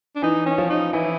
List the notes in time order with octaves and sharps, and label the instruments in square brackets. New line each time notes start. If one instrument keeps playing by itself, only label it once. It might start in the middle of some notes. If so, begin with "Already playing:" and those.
[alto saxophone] D4
[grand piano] E3 [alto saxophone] D#4
[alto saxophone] C#4
[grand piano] F3
[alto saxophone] D#4
[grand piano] E3 [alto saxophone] E4